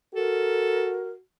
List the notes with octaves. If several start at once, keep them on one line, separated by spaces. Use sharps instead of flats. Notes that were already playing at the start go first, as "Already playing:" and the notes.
F#4 A4 A#4